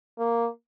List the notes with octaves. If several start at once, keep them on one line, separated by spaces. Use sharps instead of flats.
A#3